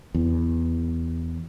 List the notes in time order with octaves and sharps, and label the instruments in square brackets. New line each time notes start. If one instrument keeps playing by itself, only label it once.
[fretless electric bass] E2